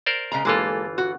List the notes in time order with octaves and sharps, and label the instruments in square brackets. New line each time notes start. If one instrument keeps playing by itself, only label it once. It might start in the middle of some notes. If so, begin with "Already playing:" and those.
[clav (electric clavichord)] A#4 C5 D5
[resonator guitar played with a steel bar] C#3 G#3 A#5
[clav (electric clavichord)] G1 E3 F4 [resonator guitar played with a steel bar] G#3 A#3 A4
[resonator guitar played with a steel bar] F#4